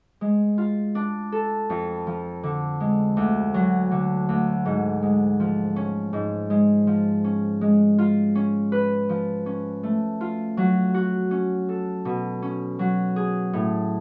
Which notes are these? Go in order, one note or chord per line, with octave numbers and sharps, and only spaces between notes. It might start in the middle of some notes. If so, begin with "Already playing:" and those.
G#3
F4
D4
A4
F2
F3
D3
G#3
D2
F#3
D3
D2
G#2
G#3
F3
C#4
G#2
G#3
F3
C#4
G#3
F4
C#4
B4
F3
C#4
A3
F4
F#3
F#4
C#4
A4
B2
C#4
F#3
G#4
A2